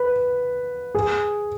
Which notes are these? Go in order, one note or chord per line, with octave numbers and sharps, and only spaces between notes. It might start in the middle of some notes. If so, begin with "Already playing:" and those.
Already playing: B4
G#4